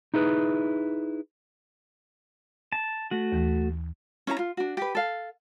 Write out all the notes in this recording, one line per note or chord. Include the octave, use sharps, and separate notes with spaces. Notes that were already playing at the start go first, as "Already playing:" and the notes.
D#4 E4 G#4 B4
A5
A3 F#4
D#2 E3
C#4 E4 C5 A#5
F4
D4 F#4
G4 B4
A4 F5